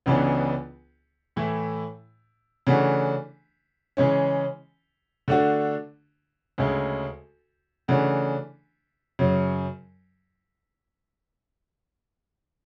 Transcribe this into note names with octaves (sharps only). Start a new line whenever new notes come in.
C#2 C#3 E3 B3 D4
A2 E3 A3 E4
C#3 E3 A3 D4 F#4
C#3 E3 G#3 C#4
D3 A3 D4 F#4
D2 C#3 G#3
C#3 E3 A3 D4 F#4
F#2 C#3 F#3